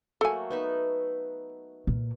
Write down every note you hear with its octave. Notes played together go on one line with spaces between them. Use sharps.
F#3 A3 A#3 A4 G#5
B3 D#4 E5
A#2